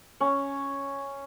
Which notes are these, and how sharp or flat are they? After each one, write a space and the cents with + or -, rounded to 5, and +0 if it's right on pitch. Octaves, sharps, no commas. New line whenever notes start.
C#4 +0